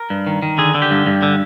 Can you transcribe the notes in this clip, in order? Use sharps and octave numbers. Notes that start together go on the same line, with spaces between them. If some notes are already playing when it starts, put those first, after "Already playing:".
Already playing: A#4
G2
D#3
D#3
D3 G#4
D3
G4
G2
G2
D3